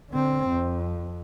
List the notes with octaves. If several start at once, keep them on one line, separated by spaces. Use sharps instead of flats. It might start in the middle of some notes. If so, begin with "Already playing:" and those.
D3 C4
F2